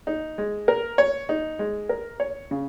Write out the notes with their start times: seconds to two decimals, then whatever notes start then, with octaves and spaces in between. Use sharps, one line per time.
0.07 D#4
0.38 G#3
0.68 A#4
0.98 C#5
1.29 D#4
1.59 G#3
1.89 A#4
2.20 C#5
2.51 C#3